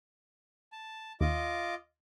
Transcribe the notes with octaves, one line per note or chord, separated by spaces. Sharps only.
A5
D#2 F4 D#5 D6